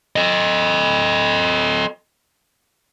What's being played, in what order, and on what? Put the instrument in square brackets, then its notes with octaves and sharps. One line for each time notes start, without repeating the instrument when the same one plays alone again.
[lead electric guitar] A4 D#5